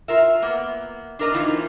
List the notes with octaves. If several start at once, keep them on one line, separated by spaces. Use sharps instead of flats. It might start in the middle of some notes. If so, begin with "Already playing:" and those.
F4 A#4 E5
A#3 B3
D4 A#4 D#5
E3 A#3 C4 D#4 F4